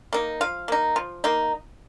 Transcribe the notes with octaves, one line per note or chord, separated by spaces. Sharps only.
A#3 D#4
F3 F5
A#3 D#4
F3
A#3 D#4